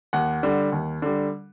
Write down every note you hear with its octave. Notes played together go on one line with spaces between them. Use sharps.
D#2 F#5
D3 G3
D#2
D3 G3